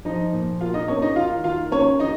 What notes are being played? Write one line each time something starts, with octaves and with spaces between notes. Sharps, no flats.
F3 D#4 D#5
A#2
A#3 F4 F5
D#4 D#5
A#3 C#4 C#5
D#4 D#5
D#3 F4 F5
D#3 F4 F5
A#3 C#4 C#5
D#3 D#4 D#5